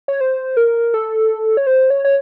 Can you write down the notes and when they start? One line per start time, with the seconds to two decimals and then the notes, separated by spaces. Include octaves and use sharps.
0.08 C#5
0.21 C5
0.57 A#4
0.94 A4
1.57 C#5
1.67 C5
1.90 C#5
2.05 C#5